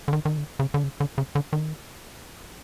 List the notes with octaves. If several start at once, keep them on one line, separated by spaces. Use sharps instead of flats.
D3
D#3
D#3
D3
C#3
D3
C#3
D3
C#3
D3
D#3